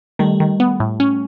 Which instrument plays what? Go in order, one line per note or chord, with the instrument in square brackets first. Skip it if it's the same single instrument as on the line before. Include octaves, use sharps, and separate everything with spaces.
[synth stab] D#3 [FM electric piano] G3 A3
[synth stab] D#3
B3
A2
C#4